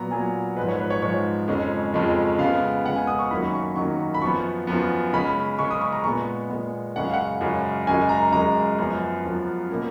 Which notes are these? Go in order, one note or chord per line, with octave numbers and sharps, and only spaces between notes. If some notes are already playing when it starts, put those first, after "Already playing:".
Already playing: A#2 F#3 B3 A#5
A#2 F#3 B3 G#5
G#2 F3 G#3 B4
C#5
B4
C#5
G#2 F3 G#3 C#5
F2 C#3 G#3 C#4
F2 C#3 G#3 C#4
C#3 G#3 B3 F5
C#3 G#3 B3 F#5
G#5
D#6
C#6
F#2 D#3 F#3 A#3 C#4 B5
C#6
F#2 D#3 F#3 A#3 C#4 C#6
B5
F#2 F3 B3 C#6
F#2 F3 B3
C#3 G#3 C#4 B5
C#3 G#3 C#4 C#6
D#6
C#6
A#5
A#2 G#3 B3 C#6
A#2 G#3 B3
F#2 C#3 G#3 C#4 F#5
F5
F#5
F#2 C#3 G#3 C#4
F#2 C#3 G#3 G#5
A#5
F#2 C#3 G#3 A#5
F#2 F3 B3
F#2 F3 B3
B2 A#3 C#4